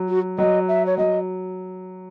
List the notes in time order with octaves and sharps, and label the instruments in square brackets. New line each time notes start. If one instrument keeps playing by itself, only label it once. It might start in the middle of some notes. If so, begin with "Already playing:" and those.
Already playing: [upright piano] F#3
[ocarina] F#4
[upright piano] F#3 [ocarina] D#5
[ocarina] E5
C#5
[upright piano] F#3 [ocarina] D#5